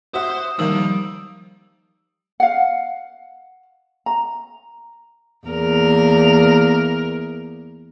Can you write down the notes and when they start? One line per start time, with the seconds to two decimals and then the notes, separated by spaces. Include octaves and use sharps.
0.14 F#4 C5 E5 C6 D#6 E7
0.59 D#3 F3 G3 A#3 E6 F#7
2.40 F5 F#5
4.06 A#5
5.47 E2 A#3 A#4